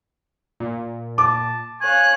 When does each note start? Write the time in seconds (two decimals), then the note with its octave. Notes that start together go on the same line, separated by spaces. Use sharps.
0.60 A#2
1.18 A5 D6
1.81 C#5 F5 G#5 F#6